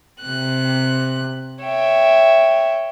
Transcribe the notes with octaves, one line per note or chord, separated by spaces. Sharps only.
C3 F#6
C#5 E5 G5